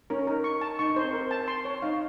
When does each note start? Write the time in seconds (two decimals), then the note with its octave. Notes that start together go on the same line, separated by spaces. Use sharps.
0.10 C#4 A#4
0.26 D#4 A#4
0.44 C#6
0.61 A5
0.79 D#4 C#6
0.90 D#4
0.96 C4 C5
1.13 A#4
1.31 A5
1.48 C6
1.65 C#5
1.82 D#4 F5